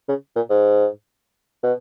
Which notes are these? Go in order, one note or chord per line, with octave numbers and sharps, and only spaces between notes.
C#3
A#2
G#2
B2